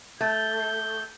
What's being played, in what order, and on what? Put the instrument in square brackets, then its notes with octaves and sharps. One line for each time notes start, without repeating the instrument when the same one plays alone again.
[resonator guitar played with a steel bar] A3 [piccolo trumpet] G6